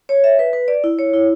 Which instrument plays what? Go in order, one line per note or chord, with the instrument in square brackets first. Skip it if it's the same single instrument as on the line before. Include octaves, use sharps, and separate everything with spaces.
[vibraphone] C#5
E5
B4
B4
D5
E4
C#5
E4